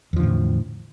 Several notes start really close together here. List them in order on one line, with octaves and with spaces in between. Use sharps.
E2 F3 D3 A2